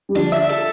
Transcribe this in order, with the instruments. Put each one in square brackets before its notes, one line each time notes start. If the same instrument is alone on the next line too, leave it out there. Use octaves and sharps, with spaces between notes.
[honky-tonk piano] G3
[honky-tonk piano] D3 F3 [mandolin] D4
[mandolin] E5
A4